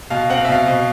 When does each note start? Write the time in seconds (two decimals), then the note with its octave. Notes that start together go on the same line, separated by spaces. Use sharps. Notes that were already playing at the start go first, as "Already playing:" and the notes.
0.10 B2 F5
0.30 C4 F#5
0.37 F5
0.45 E5
0.48 B2 F5
0.67 B2